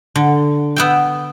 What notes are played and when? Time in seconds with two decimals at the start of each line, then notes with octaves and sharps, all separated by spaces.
0.16 D3
0.76 B3 E5 G5